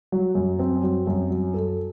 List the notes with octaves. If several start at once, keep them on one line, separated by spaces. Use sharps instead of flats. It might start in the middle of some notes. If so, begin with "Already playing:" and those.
F#3
F#2
C4
F#3
F#2
F#3
A4